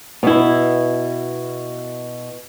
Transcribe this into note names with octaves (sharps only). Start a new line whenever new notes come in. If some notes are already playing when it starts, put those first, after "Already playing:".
B2 E4